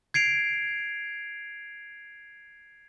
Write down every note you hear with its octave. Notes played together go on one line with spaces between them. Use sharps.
G#6 C7 D7 F7